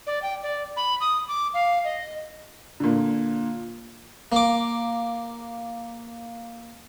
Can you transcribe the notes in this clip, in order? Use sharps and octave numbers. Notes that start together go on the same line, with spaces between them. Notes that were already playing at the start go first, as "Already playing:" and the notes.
D5
G5
D5
B5
D#6
D6
F5
D#5
A#2 D3
A#3 D6